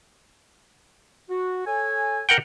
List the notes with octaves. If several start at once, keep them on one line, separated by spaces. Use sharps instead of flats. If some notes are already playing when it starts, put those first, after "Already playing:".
F#4
A4 C#5 G#5
A#4 F#5 G5